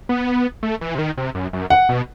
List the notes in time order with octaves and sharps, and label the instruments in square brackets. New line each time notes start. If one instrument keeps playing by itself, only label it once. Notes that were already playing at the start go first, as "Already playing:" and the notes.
[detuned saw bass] B3
A3
E3
C3
D#3
C3
F#2
F#2
[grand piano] F#5
[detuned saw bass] B2